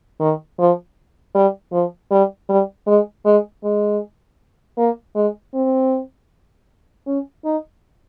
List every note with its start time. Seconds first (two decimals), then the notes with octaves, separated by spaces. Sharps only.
0.20 D#3
0.59 F3
1.35 G3
1.72 F3
2.11 G3
2.49 G3
2.87 G#3
3.25 G#3
3.64 G#3
4.78 A#3
5.15 G#3
5.54 C4
7.07 C#4
7.45 D#4